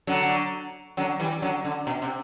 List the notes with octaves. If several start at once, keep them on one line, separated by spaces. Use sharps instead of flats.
D3 F#3
D3 F#3
E3 G3
D3 F#3
D3
B2
C3